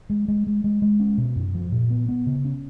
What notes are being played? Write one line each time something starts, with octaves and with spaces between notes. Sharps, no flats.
G#3
G#3
G#3
G#3
G#3
C#4
B2
F#2
F3
A#2
B3
B3
C#3
C#4